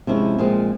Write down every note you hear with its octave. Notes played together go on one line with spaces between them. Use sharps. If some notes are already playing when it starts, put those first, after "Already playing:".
C3 F3 G#3 C#4 E4
A#2 F3 G#3 C4